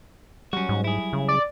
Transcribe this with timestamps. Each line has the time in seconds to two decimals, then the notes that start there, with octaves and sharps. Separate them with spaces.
0.53 F#3 G3 C#4 F#4
0.69 G#2
0.84 E4 G#4
1.13 C#3
1.28 D5